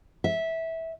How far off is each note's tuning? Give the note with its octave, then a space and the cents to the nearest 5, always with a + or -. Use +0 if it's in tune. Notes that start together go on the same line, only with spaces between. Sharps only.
E5 -15